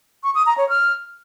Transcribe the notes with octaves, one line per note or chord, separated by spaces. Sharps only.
C#6
D#6
A#5
C#5
F6